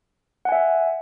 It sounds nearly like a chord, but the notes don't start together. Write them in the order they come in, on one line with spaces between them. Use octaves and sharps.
F#5 G#5 E5